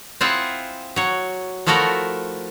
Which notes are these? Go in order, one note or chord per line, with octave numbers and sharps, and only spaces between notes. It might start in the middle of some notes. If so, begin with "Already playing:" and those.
C4 E4 F4 G#4 E5 F#5
F#3 C#5
F3 A3 E4 F#4 A4 A#4